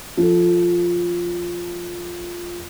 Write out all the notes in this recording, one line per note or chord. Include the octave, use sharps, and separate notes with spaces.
F3 A4